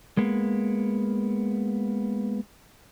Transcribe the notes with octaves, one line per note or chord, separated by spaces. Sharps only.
G#3 A#3 B3